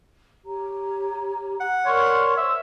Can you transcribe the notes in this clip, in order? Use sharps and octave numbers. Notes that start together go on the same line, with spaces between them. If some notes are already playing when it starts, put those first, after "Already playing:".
G4 C#5 A#5
F#5
A#4 C#5 D5 C6 F6
C5 E5